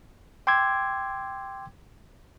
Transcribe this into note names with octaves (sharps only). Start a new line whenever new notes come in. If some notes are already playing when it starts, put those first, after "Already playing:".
G5 C6 D6 E6 G#6